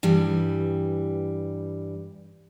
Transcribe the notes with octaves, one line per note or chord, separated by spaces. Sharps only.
G2 E3 G3